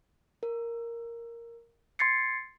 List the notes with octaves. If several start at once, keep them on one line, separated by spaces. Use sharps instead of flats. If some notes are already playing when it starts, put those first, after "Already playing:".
A#4
C6 G#6 A6 C7 C#7